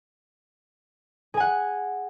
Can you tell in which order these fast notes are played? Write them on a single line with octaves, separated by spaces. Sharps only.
G#4 G#5 F#5